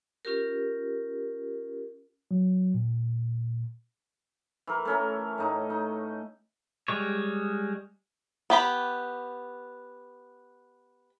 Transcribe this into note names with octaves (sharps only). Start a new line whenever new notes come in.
C#4 F4 G4 A#4
F#3
A#2
E3 A#4
A3 C#4 A#4
A2 D#4
D#4
G3 G#3 C#5
B3 G4 B5